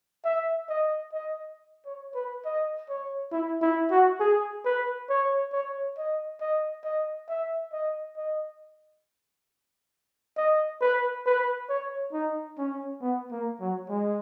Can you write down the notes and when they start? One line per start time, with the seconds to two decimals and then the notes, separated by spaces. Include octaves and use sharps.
0.25 E5
0.69 D#5
1.13 D#5
1.86 C#5
2.15 B4
2.45 D#5
2.89 C#5
3.32 E4
3.62 E4
3.91 F#4
4.20 G#4
4.66 B4
5.10 C#5
5.53 C#5
5.98 D#5
6.41 D#5
6.85 D#5
7.29 E5
7.73 D#5
8.17 D#5
10.37 D#5
10.81 B4
11.26 B4
11.70 C#5
12.13 D#4
12.58 C#4
13.02 B3
13.32 A#3
13.61 F#3
13.89 G#3